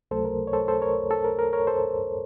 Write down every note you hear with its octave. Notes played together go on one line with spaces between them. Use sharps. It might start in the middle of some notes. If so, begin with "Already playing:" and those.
C#2 C3 F#3 A3 A4 C5
A#4
C#5
A4 C5
A4 C5
A#4 C#5
A4
A#4
A#4
A#4 C#5
A4 C5